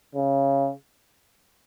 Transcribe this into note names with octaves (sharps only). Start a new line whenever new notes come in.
C#3